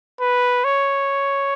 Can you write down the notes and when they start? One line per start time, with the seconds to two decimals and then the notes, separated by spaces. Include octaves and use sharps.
0.20 B4
0.64 C#5